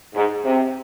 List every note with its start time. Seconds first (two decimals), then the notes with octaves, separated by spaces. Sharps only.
0.14 G#2
0.44 C3